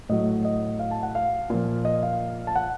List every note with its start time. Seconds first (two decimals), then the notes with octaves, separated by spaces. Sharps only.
0.09 A2 F#3 D#5
0.45 D#5
0.79 F5
0.91 A5
1.03 F#5
1.15 F5
1.50 A#2 F3
1.85 D#5
2.03 F5
2.47 A5
2.56 F#5